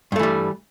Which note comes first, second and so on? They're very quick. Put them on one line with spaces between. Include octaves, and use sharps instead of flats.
G2 A3 E3 G3